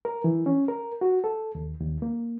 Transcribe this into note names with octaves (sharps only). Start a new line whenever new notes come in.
A#4
E3
C#4
A#4
F#4
A4
D#2
D#2
A#3